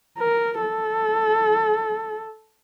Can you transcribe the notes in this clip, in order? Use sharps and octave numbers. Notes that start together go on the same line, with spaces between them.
A#4
A4